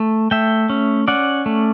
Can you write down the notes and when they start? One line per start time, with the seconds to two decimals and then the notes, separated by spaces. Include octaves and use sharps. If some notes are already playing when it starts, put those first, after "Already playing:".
Already playing: A3
0.31 A3 E5 G5
0.70 C#4
1.08 C#4 D5 F#5
1.46 A3